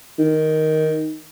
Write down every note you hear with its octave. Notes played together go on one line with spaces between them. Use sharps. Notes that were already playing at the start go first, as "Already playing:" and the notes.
D#3